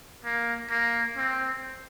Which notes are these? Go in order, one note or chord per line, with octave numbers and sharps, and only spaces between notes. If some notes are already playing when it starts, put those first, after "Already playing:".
A#3
A#3
C4